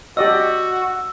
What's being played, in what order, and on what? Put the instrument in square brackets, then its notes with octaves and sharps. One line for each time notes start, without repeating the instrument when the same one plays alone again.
[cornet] F#4 [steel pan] G4 D5 D#5 [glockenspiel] E6